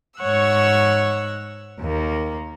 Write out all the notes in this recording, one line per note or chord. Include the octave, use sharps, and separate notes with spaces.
G#2 C#5 F#5 C#6 E6
D#2 A#3